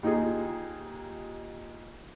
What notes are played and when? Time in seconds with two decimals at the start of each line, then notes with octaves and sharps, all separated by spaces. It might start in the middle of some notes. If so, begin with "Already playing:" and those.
0.03 D#2 D#4 F4 G#4